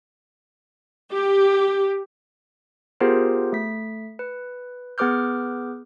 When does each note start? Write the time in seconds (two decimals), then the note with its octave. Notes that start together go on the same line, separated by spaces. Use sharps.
1.11 G4
3.00 B3 F4 G4 G#4 A#4 C5
3.52 A3 B6
4.19 B4
4.98 B3 G#4 B4 D6 F6 G6